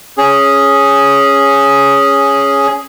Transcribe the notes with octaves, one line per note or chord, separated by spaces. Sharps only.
C#4 G#4